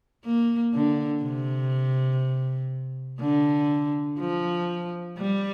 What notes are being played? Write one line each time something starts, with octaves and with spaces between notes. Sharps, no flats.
A#3
D3
C3
D3
F3
G3